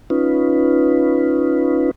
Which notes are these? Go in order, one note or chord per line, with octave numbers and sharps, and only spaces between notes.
C#4 D#4 F4 B4